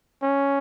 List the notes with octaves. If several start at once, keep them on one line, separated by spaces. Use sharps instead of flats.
C#4